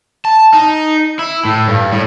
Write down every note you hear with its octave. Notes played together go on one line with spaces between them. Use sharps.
A5
D#4
E4
A2
G2
A2